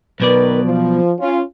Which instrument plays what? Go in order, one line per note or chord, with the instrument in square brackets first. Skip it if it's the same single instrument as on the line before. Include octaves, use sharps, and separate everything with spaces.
[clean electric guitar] B1 B2 D5 [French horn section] D#3 A#4 B4
[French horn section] F3
C#4 F4